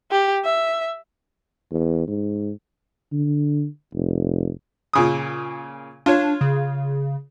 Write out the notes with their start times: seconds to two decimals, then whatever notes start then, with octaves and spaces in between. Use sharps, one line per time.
0.11 G4
0.45 E5
1.71 E2
2.08 G#2
3.12 D3
3.94 F1
4.93 A#2 C#3 D#6
6.06 D4 F4 C#5
6.41 C#3